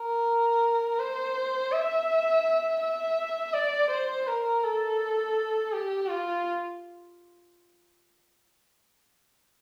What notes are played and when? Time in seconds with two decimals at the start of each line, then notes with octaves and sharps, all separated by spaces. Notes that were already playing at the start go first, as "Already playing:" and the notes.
Already playing: A#4
0.99 C5
1.72 E5
2.82 E5
3.54 D5
3.90 C5
4.27 A#4
4.64 A4
5.73 G4
6.10 F4